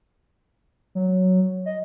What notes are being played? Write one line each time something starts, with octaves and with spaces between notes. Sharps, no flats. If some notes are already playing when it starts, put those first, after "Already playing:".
F#3
D#5